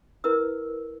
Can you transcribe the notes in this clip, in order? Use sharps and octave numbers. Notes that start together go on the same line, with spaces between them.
E4 A#4 B4 E6